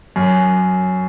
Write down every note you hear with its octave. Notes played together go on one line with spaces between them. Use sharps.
F#2